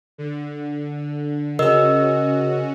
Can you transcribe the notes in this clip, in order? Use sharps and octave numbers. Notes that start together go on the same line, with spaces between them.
D3
C#3 C#4 F#4 A#4 D#5 E6